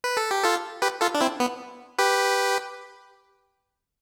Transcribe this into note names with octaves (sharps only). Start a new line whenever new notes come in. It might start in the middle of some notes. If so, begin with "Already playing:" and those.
B4
A4
G4
F4 A4
G4 B4
F4 A4
D4
C4 E4
B3
G4 B4